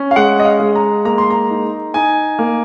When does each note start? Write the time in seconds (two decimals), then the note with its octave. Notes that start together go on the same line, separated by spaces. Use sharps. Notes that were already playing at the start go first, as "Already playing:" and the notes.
Already playing: C#4
0.11 F5
0.16 G#3 F#5
0.40 D#5
0.45 F5
0.60 G#3
0.75 A#5
1.05 A#3 A#5
1.18 C6
1.30 A#5
1.50 D#4
1.94 D#4 G#5
2.39 A#3